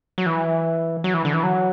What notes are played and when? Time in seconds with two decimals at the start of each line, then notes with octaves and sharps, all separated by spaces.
0.18 F#3
0.26 E3
1.04 F#3
1.14 E3
1.25 D3
1.34 E3
1.43 F#3